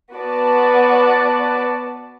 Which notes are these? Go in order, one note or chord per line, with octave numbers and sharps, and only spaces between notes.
B3 F#4 B4 D5 A5